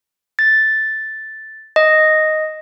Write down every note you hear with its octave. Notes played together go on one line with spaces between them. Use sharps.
A6
D#5